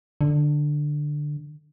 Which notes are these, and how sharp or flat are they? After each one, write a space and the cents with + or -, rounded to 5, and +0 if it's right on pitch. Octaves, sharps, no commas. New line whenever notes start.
D3 +10